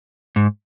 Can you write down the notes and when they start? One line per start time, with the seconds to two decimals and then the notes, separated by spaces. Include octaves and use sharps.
0.36 G#2